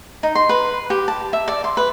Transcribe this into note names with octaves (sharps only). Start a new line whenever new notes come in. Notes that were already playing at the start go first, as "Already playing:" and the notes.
D#4
C6
B4
G4
A5
E5
D5
C6
B4